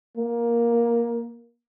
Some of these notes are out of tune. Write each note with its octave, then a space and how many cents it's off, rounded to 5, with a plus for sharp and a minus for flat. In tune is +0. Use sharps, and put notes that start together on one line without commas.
A#3 +10